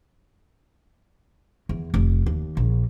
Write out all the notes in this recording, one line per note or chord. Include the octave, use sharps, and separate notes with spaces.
E2
F1
D#2
A#1